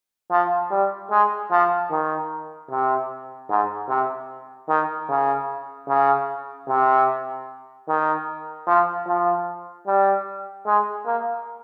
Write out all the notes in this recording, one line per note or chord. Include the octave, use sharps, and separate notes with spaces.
F3
G3
G#3
F3
D#3
C3
G#2
C3
D#3
C#3
C#3
C3
D#3
F3
F3
G3
G#3
A#3